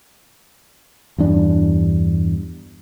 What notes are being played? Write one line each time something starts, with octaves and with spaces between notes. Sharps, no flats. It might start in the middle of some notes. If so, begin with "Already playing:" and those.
E2 G2 D4